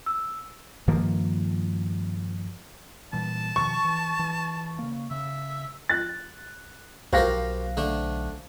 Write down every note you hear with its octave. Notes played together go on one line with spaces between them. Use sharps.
E6
G2 D#3 F3 A#3
A#2 E3 G3 A5
B2 D#3 F3 C#6
E3
E3
C#3 A#3
C#3 E5
F#6 A6
B1 F#4 G4 A#4 C5 F5 A#6
D3 A3 D4